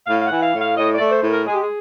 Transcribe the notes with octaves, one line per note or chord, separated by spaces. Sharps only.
A2 F5
F5
F#5
E3
F5
A2
F5
A2 D#5
A3 D5
C5
A2
A#4
G#3 G#4
G4
G#4